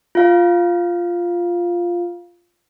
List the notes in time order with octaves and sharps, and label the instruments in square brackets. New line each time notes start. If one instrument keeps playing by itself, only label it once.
[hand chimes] F4 F5